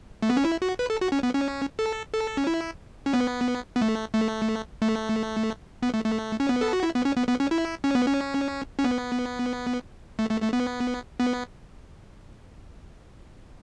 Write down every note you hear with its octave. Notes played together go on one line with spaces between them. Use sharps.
A3
B3
C#4
E4
F#4
B4
A4
F#4
C#4
B3
C#4
A4
A4
C#4
E4
C#4
B3
B3
A3
A3
A3
B3
A3
A3
C#4
B3
A4
F#4
E4
B3
C#4
B3
B3
C#4
E4
C#4
B3
C#4
C#4
B3
A3
A3
A3
B3
B3